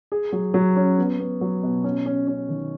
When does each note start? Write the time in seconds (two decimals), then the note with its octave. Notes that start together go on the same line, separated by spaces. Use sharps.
0.12 G#4
0.32 F#3
0.54 F#3
0.76 C#4
0.98 B3
1.19 B3
1.41 F#3
1.63 B2
1.84 C#4
2.06 C#4
2.27 C#4
2.49 D#3